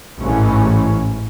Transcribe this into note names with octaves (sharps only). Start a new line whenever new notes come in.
A1 G#2 E3 C#4